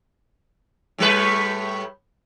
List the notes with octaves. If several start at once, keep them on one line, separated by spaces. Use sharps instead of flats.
A2 G3 B4